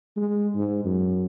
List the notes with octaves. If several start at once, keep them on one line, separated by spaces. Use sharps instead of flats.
G#3
G#2
F#2